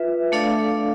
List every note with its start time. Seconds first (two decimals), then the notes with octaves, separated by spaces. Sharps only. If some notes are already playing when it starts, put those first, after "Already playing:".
Already playing: F4 B4 E5
0.32 A3 D4 A4 D5 F5